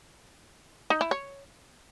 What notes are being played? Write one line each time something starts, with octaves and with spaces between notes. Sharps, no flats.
D#4
E4
C#5